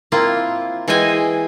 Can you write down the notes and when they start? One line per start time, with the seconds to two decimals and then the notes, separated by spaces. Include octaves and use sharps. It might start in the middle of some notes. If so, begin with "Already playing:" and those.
0.12 A#3 C4 E4 F4
0.88 E3 G#3 E4 D#5 G5 G#5
1.08 C5